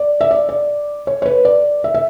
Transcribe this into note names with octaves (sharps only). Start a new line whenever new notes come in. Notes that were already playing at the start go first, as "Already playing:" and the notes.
Already playing: D5
E5
D5
D5
C#5
C#5
B4
D5
E5
E5